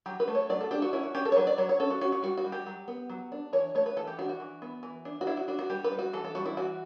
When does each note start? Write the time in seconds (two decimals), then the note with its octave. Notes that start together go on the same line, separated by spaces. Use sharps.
0.06 F#3 G4
0.20 B4
0.28 A3
0.35 C#5
0.50 F#3 D5
0.61 A4
0.71 D4 G4
0.82 F#4
0.93 C#4 E4
1.03 F#4
1.14 C#4 G4
1.25 A4
1.32 C#5
1.36 F#3 B4
1.47 D5
1.58 F#3 C#5
1.69 C#5
1.80 C#4 A4
1.90 F#4
2.01 C#4 F#4
2.12 F#4
2.23 G3 F#4
2.37 F#4
2.44 G3
2.52 G4
2.67 F#3
2.88 B3
3.09 F#3
3.32 D4
3.53 E3 C#5
3.75 A3 C#5
3.86 B4
3.97 E3 A4
4.07 G4
4.19 D4 F#4
4.29 F#4
4.40 E3
4.62 B3
4.83 E3
5.05 D4
5.21 F#4
5.27 D4 E4
5.37 F#4
5.48 D4 F#4
5.59 F#4
5.70 G3 G4
5.84 B4
5.92 G3
5.99 F#4
6.13 E3 A4
6.24 A4
6.35 G3 F#4
6.46 E4
6.57 E3 F#4